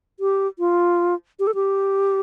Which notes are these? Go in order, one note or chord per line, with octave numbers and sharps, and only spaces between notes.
G4
F4
G4
A4
G4